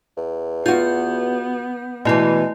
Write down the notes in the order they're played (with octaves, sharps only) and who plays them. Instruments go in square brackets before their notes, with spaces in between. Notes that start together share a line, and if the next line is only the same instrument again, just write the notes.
[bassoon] E2
[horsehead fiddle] B3 [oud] F4 F#4 [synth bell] G6
[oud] B2 E3 [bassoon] G#3 [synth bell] A3 E4